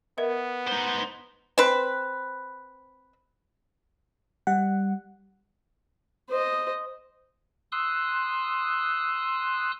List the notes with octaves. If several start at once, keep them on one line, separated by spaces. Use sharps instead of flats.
B3 A#4 D#5 E5
D#4 C5
C4 B4
G3 F#5
C5 D#5
C6 D#6 E6 F#6